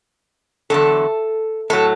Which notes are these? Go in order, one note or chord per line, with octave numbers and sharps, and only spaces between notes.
E2 D3 F#3 A4
A2 F#3 A4